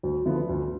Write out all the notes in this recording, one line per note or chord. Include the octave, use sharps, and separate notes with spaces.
D2
D3 F3 B3 E4
D2